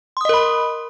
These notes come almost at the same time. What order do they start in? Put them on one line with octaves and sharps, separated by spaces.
C6 D#6 D#5 A#4 B5